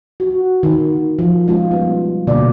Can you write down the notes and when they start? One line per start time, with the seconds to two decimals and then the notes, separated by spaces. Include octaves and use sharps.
0.20 F#4
0.63 D#3
1.19 F3
1.48 G#3 C#4 F4
1.71 G3 B3
2.27 B2 D3 A#3 D5